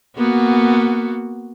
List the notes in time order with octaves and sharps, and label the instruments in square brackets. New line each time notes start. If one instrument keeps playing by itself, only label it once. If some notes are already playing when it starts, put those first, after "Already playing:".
[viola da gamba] A#3 B3 F#4